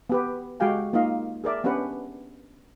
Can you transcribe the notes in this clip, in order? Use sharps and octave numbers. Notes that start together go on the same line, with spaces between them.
B3 G4 B4
G#3 F#4 G4 F5 G5 G#5
A#3 D#4 F4 D#5 F5
G#4 A#4 D5 E5
B3 C#4 D4 G4 B4 F#5